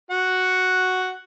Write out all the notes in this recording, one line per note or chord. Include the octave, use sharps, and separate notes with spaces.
F#4 F#5